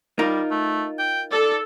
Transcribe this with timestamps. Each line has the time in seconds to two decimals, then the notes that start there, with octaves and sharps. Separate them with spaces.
0.19 G3 D#4 F4 A#4
0.51 A3
0.99 G5
1.31 A4 D5